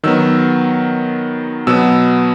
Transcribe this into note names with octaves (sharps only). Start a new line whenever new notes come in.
D#3 F#3 B3 E6
B2 F#3 B3 E6